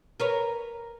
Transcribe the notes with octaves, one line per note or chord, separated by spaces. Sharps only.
A#4 B4 C#5